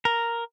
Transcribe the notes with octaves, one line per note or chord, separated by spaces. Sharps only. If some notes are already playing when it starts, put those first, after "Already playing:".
A#4